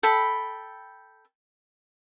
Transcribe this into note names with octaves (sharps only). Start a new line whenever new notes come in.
A4 G5 B5